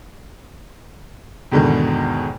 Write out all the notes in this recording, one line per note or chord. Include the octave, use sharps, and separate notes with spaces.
E2 G#2 B2 D3 D#3